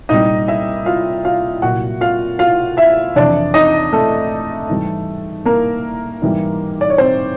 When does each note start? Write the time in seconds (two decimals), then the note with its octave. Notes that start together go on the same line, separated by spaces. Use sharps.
0.09 C2 A#2 G3 D#4 D#5
0.48 E4 E5
0.86 F4 F5
1.25 F4 F5
1.62 C2 A#2 F#3 F#4 F#5
2.01 F4 F5
2.39 F4 F5
2.77 E4 E5
3.16 F2 C3 E3 D4 D5
3.54 D#4 D#5
3.93 A3 A4
4.69 G#2 E3 G3
5.45 A#3 A#4
6.22 G#2 E3 G3
6.81 D5
6.90 C#5
6.98 C4 C5